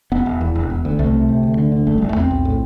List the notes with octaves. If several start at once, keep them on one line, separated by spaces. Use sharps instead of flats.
E1 B3
E1
E2
E1
E1
D2
C2 A3
C3
C3
D2
D3
D3
F#1 A3
F#1 G3
A3
E2 C4
B1
A2